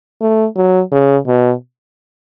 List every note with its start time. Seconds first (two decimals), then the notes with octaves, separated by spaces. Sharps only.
0.21 A3
0.56 F#3
0.92 C#3
1.27 B2